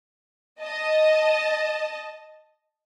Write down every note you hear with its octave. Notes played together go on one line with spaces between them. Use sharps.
D#5 A5